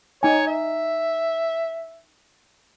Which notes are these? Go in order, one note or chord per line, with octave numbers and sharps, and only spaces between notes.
D#4 C#5 G#5
E5